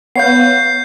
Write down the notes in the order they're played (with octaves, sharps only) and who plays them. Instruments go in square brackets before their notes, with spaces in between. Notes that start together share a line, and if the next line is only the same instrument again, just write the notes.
[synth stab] B3 C#5 F5 [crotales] G6 C7